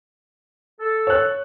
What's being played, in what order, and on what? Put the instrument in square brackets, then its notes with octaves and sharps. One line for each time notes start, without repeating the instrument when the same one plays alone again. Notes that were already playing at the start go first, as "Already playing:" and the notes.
[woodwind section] A4
[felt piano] C#5 F#6